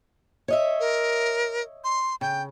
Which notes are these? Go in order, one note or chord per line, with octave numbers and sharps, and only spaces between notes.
C#5 D#5 E5
A#4
C6
C#3 G5